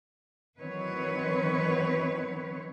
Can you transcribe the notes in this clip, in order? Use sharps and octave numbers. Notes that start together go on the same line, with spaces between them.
D#3 E3 F#3 C4 B4 C#5